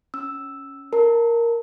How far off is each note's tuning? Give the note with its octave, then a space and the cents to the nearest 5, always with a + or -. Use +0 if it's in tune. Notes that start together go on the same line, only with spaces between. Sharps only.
C#4 +0 E6 +0
A#4 +0 A5 +20